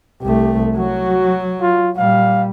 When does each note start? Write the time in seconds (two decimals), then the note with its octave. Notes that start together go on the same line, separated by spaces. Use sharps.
0.22 C2 A3 G4
0.77 F#3 F#4
1.61 F4
1.97 A#2 G3 F5